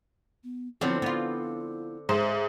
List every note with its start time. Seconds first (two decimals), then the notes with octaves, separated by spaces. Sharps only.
0.44 B3
0.81 D3 F3 F#3 B3 C4 E4
1.02 B3 F4
2.09 G#2 C5 E5